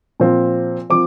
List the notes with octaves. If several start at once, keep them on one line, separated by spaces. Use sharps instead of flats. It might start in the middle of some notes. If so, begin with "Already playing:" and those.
A#2 F3 C4 F4
F3 C4 D6